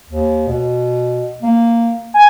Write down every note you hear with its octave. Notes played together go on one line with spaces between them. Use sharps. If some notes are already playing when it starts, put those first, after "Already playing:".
D#2
B2
A#3
G#5